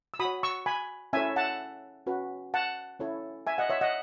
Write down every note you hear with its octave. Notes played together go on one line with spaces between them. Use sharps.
E6
F#4 B5 D#6
C#5
C#6 E6
G#5 B5
C#4 E4 A4 C#5 E5 G#5
F#5 A5
C#4 F#4 B4
F#5 A5
C#4 E4 A4 C#5
E5 G#5
D#5 F#5
C#5 E5
D#5 F#5